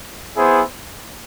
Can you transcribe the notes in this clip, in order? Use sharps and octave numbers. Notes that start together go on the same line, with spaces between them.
B3 E4 G#4 C5